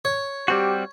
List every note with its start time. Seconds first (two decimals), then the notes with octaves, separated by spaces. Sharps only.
0.05 C#5
0.48 G3 C4 F#4 G4